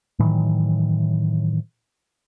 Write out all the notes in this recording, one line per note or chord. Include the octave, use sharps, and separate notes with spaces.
A2 D#3 E3 F#3